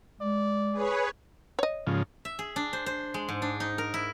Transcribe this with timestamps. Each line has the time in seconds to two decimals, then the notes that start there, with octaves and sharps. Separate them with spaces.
0.21 G#3 D5
0.72 G#4 B4 C#5
1.59 C#5 D#5
1.87 G#2 C#3 F3
2.25 E5
2.39 G#4
2.56 D4
2.73 C5
2.86 C5
3.14 G#3
3.29 G#2
3.42 D4
3.60 D#4
3.78 A#4
3.94 E4